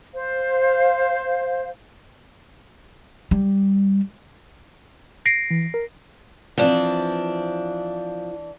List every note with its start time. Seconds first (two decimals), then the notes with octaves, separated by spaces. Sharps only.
0.14 C5 F5
3.31 G3
5.26 A#6 C7 D7
5.51 E3
5.74 A#4
6.58 E3 F3 C4 D4